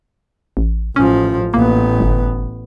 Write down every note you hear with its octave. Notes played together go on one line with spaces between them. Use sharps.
A1
A1 F3 C#4
A1 A#3 B3
G1